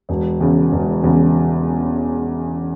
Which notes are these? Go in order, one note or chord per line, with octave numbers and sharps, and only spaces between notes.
E1
E2 C#3
E1
E2 C#3